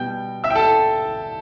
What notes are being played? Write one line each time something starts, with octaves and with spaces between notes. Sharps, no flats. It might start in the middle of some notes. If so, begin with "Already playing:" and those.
Already playing: B2 G3 B3 G5 G6
E5 E6
G5
A4 A5